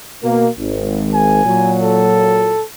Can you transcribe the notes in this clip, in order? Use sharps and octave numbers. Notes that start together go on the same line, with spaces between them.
B2 A#3
G#1
G#5
A#2 F#3
A4